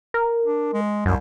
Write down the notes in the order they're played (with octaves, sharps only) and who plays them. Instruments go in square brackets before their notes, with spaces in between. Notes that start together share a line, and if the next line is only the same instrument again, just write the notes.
[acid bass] A#4
[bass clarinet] D4
G#3
[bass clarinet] C2 [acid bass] F#2